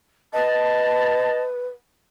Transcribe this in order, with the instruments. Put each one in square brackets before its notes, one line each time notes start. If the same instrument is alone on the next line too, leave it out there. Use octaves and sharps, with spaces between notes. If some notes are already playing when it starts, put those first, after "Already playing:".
[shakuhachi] B4 [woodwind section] D#5 A5